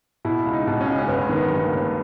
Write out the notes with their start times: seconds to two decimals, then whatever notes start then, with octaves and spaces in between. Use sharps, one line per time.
0.25 B2 E4
0.45 C#2
0.53 D#4
0.67 B2
0.81 C#4
0.87 C#2
0.98 C#4
1.08 G1 B3
1.29 D#3
1.36 B3
1.50 G2
1.64 A#3
1.71 G1